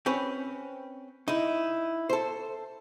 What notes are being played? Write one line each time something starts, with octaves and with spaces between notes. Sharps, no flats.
C4 C#4 B4
D#4 E4
A4 C5